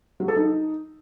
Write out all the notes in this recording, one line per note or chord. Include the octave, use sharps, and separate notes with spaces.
F#3
A4
D#4